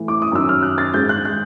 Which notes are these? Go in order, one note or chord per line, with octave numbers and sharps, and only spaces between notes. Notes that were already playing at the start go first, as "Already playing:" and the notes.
Already playing: A2 E3
D6
D#6
F#2 D#3 E6
F6
F#6
A6
G#2 D#3 G6
F#6
F#6